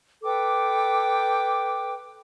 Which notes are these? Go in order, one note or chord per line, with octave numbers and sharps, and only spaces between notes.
A4 B4 G5 D6